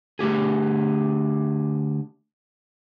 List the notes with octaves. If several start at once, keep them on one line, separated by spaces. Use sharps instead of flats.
D3 A3 G4 G#4